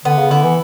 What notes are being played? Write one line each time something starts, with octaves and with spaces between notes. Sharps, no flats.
D3 B3
C#3
D3 E4
E3